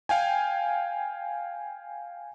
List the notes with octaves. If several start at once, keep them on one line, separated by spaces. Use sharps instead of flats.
F5 G5 G#5